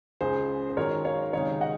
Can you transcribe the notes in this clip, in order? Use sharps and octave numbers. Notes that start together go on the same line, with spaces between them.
C#2 C#3 G#3 G#4 C5
C5
G#2 D#3 F#3 A#4 C#5
C#5 F5
C#2 C3 D#3 G#3 D#4 C#5 F5
D#5 F#5